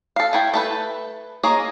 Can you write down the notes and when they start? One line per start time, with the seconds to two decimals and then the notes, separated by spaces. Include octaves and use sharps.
0.16 A4 F5
0.33 A3 E4 G5
0.54 A3 A4 B4
1.43 A#3 G#4 C#5 D#5